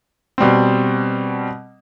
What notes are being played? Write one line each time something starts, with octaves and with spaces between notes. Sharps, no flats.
B2 G3 C4